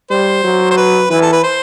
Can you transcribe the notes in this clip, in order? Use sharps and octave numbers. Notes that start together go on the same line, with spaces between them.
G3 C5
F#3
C5
B4
E3 B4
A4
B4
C5